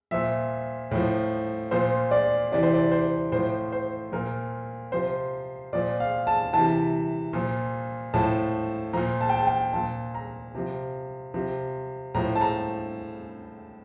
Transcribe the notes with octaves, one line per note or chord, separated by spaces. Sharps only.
A#2 F3 E5
A2 F3
A#2 F3 C5
D5
C3 E3 D5
C5
D5
C5
A2 F3 C5
C5
A#2 F3 A#4
C3 F3 C5
A#2 F3 D5
F5
A5
C3 E3 A5
A#2 F3
A2 F3 A5
A#2 F3 A#5
A5
G5
A5
G5
A#2 F3 A5
A#5
C3 F3
C3 F3
A2 F3 A#5
A5
A#5